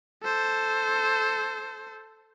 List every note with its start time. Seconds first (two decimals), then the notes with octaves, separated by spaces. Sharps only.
0.23 A4 C5